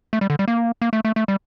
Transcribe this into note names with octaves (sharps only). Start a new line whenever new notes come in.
A3
G3
D3
G3
A#3
A#3
A3
A3
A3
G3